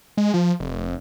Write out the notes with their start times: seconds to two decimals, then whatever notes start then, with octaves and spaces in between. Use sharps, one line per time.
0.17 G#3
0.34 F3
0.60 F1